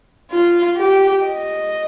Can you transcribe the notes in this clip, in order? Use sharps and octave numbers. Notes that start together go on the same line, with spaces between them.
F4
G4
D#5